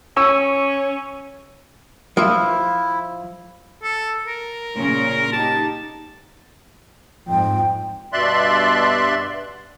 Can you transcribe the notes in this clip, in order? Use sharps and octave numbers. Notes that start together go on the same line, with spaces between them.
C#4 C#6 E6
F3 E4 E5
A4
A#4
A#2 C#3 C#4
D#4 G4 A5
F2 G#2 G5
G2 B2 D5 E5 C6 F#6